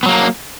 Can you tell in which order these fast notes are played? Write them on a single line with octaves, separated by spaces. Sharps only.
B3 F#3 A#3